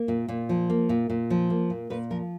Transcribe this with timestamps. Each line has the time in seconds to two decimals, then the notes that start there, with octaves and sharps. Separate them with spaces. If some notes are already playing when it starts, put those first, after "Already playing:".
Already playing: A#3
0.08 A#2
0.28 A#2
0.49 F3
0.70 A#3
0.89 A#2
1.10 A#2
1.30 F3
1.50 A#3
1.70 A#2
1.90 A#2 B4
2.11 F3 A#4